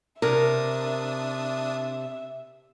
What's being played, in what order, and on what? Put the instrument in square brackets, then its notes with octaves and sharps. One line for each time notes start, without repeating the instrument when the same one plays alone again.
[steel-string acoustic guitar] C3 [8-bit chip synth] D4 D#6 [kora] A#4 [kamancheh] E5